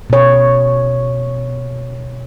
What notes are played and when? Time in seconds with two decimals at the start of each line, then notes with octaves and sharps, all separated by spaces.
0.10 B2 C#5